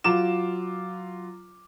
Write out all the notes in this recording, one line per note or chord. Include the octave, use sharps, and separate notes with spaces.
F#3 F4 D6 E7